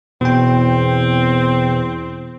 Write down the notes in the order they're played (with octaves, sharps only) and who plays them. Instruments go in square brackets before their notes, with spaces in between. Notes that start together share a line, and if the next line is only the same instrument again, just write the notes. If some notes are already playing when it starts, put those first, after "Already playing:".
[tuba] E2 [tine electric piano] B2 G5 [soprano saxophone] C4